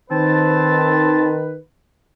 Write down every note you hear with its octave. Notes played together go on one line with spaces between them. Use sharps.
D#3 C4 B4 C5 A5